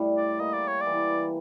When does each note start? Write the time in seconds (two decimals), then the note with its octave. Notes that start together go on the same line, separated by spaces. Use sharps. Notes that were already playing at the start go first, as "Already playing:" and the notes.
Already playing: A2 G3
0.17 D5
0.39 A#3 D#5
0.54 D5
0.67 C#5
0.81 D5
0.86 E3